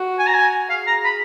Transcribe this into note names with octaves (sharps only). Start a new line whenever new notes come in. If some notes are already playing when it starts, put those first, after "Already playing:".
Already playing: F#4
G#5
A#5
G#5
G#4 F5
A#5
B5